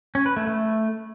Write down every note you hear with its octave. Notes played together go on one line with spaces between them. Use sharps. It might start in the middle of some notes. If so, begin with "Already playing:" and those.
C#4
B4
A3
A3